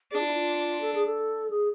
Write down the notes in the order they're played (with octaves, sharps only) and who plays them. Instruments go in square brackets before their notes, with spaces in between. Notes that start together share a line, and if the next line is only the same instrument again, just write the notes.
[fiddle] D4 [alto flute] G#4
[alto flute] F4
E4
F4
A4
G#4
A4
G#4